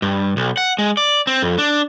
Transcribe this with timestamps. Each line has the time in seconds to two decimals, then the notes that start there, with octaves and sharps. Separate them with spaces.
0.02 G2
0.37 B1
0.57 F#5
0.79 G#3
0.97 D5
1.27 C4
1.42 F2
1.58 D4